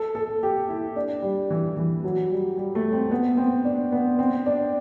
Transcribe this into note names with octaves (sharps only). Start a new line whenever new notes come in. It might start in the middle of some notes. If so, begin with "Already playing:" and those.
Already playing: A4
A4
G4
E4
D4
G3
E3
E3
F#3
G3
G3
A3
C4
B3
C4
D4
B3
C4
D4